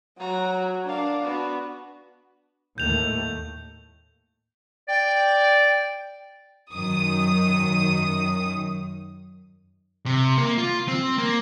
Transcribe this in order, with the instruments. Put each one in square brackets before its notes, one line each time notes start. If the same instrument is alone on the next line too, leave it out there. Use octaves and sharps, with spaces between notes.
[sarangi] F#3 [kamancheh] F#4 A#5
[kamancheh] F#4
[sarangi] D4 [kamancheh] A#4 F5
[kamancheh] B3 F#4
[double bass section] D#2 A2 A3 [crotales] G6 F7
[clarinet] D5 [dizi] G5
[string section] F#2 D#3 D#6
[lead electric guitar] C3
A#3
F4
C4
A#3